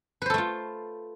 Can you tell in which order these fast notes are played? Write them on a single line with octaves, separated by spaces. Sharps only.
B4 C5 A4 A3 F4